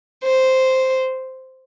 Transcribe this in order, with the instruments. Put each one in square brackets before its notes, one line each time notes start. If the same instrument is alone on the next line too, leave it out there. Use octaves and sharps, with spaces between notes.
[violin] C5